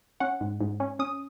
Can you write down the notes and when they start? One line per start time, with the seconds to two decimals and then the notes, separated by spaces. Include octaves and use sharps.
0.20 C#4 F#5
0.41 G#2
0.61 G#2
0.80 C#4
0.99 C#4 D#6